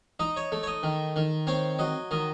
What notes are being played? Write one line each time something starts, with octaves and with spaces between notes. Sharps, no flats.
D#4 D#5
C#5
A3
C#5
D#5
D#3
D#3
C4 C#5
F#3 D#5
D#3 D#5